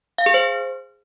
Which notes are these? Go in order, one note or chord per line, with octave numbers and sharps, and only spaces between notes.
F5
G#4
C5